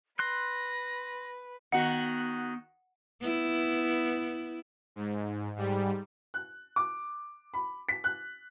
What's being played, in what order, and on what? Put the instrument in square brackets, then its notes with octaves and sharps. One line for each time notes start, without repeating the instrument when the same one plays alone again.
[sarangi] B4 [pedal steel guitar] C6 F#6 [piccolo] A#6
[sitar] D#3 F#4 [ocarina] B3 [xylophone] F#5
[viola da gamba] B3 E4
[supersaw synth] G#2
G#2 G3
[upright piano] F#6
D6
B5
B6
F#6